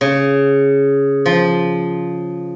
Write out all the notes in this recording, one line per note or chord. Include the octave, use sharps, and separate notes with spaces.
C#3
F3